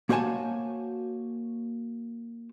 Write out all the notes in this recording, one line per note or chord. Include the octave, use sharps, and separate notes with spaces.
A#3 F#4 C5 C#5 G#5 A5